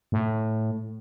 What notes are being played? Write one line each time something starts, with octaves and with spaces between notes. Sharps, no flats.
A2